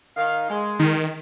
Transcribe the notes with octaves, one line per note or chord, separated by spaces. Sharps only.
D#3 F5
G#3
D#3